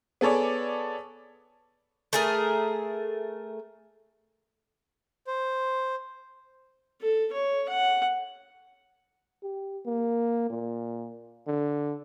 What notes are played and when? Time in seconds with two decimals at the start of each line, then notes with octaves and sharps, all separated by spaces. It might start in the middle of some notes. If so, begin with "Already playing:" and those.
0.21 B3 G#4 A4 C#5 D5
2.13 A3 G#4 A#4
5.27 C5
7.02 A4
7.33 C#5
7.69 F#5
9.43 G4
9.85 A#3
10.50 A#2
11.47 D3